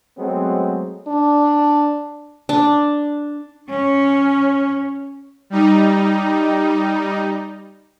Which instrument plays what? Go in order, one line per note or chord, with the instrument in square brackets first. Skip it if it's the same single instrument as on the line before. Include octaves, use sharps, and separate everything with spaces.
[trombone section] F#3 G#3 A3 B3 C4 G#4
[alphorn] D4
[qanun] D4
[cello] C#4 C#5
[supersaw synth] G3 D#4